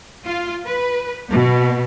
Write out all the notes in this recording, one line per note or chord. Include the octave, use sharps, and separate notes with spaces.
F4
B4
B2